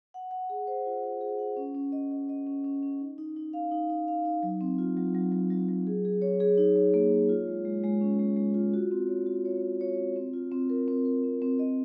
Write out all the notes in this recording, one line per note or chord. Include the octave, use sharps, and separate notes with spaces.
F#5
F#5
G#4
C5
F4
F#5
G#4
F#5
C#4
C#4
D#5
D#5
D#5
C#4
C#4
C#4
D#4
D#4
D#4
F5
D#4
D#4
F5
D#4
F#3
C4
F4
F#3
F#3
F#3
F#3
F#3
G#4
G#4
C#5
G#4
D#4
C#5
A#3
C#5
F4
G#3
G#3
G#3
C#4
G#3
G#3
F4
F#4
C4
C#5
F#4
C#5
C#5
C#5
C4
C4
F4
C4
A#4
C4
A#4
C4
C4
D#5